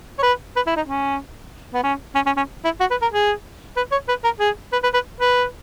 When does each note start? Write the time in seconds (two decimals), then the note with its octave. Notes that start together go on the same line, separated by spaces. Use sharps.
0.19 C#5
0.23 B4
0.56 B4
0.67 E4
0.76 D#4
0.87 C#4
1.74 B3
1.83 C#4
2.15 C#4
2.26 C#4
2.37 C#4
2.65 E4
2.80 F#4
2.91 B4
3.02 A#4
3.12 G#4
3.77 B4
3.92 C#5
4.09 B4
4.24 A#4
4.40 G#4
4.73 B4
4.84 B4
4.94 B4
5.21 B4